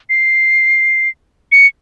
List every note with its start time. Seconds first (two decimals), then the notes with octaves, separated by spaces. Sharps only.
0.10 C7
1.52 C#7